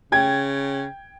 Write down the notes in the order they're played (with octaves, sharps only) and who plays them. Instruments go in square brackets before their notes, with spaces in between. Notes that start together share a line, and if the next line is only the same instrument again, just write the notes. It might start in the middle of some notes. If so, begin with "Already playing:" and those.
[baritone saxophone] C#3 [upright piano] G5 G#6